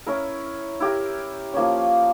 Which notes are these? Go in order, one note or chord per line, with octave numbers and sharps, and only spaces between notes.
C#4 E4 A#4
E4 G4 A#4
F3 A#3 C#4